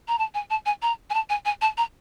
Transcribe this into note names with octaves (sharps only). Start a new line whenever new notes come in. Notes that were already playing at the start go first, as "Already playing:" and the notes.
A#5
A5
G#5
A5
G#5
A#5
G#5
A5
G#5
G#5
A5
A#5